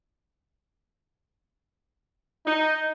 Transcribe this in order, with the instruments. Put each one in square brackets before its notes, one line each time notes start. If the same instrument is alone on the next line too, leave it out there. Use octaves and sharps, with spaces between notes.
[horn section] D#4